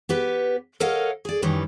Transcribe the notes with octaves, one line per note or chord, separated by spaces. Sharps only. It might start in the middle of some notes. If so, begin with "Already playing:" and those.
B3 G4 B4
A4 A#4 C#5 D#5 F5 F#5
G#4 D5
F#2 D#3 E3 G3